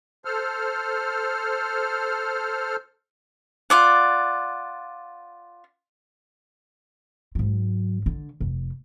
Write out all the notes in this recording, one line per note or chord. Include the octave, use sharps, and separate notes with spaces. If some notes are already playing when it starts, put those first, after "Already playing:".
A4 C5 F6
F4 D5 F#5
G#2 F#3
D3
F1